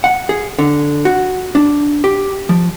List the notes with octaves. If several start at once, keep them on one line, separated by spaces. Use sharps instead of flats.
F#5
G#4
D3
F#4
D4
G4
F3